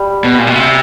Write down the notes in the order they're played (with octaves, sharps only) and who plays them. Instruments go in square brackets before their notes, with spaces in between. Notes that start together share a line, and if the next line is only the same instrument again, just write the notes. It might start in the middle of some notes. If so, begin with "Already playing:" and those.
Already playing: [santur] G3
[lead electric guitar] B2
A#2
B2
C3